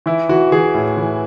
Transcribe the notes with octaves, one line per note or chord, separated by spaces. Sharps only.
E3 E4
E3 F#4
E3 G#4
A2
E3